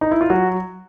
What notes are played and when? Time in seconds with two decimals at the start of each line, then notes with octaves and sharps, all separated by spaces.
0.01 D#4
0.11 E4
0.21 F4
0.30 F#3 F#4